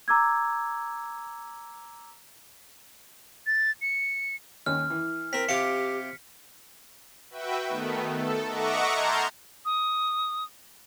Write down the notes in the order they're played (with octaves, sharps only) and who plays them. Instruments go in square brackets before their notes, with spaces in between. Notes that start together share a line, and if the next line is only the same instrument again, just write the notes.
[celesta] A#5 D6 E6 G#6
[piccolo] A6
C#7
[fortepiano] D#2 C#4 [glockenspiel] F6
[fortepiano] E3
[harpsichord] C4 A#4 [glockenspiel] B6
[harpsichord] C3 F4 D6 [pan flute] G4 [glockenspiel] C#7
[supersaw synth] F#4 B4 E5 G5
D#3 A3 B3
A4
D#5 E5 F#5 A#5 C#6 D6
A5 A#5 C6 F6 G6 G#6
[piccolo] D#6